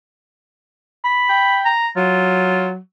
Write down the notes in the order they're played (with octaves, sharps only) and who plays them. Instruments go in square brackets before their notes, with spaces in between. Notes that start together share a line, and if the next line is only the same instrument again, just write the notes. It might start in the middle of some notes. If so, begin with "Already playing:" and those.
[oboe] B5
[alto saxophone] G5
[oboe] A#5
[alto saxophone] F#3 [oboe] F4